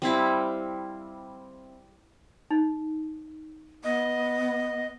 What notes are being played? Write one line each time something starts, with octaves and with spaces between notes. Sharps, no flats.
G3 C4 E4 F5
D#4
B3 D#5